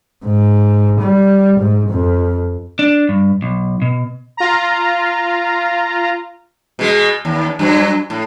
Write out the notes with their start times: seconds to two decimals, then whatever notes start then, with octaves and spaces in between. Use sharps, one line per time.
0.25 G#2
1.01 G3
1.59 G#2
1.90 F2
2.79 D4
3.09 G2
3.42 B1
3.82 B2
4.37 F4 A#5
6.79 B2 G#3
7.25 D#2
7.59 G2 F#3
8.10 A2